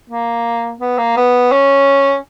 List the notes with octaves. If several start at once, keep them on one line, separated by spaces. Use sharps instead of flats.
A#3
B3
A#3
B3
C#4